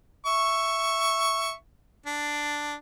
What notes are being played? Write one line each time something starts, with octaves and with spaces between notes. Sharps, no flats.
E5 C#6
D4